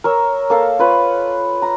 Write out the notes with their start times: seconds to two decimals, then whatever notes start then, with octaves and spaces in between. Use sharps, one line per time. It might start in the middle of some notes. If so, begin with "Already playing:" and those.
0.04 A#4 C#5 E6
0.50 A#3 A4 F5
0.79 F4 B4 C#5
1.62 A#5